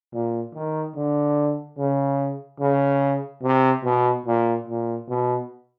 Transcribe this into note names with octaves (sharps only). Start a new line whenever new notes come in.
A#2
D#3
D3
C#3
C#3
C3
B2
A#2
A#2
B2